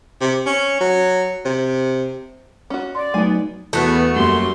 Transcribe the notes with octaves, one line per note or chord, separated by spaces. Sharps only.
C3
C#4
F#3
C3
C#4 F#4
D5 C6
F#3 A3 B3 D#4 G#5
E2 A3 B3 F#4
F#2 G3 A#3 C6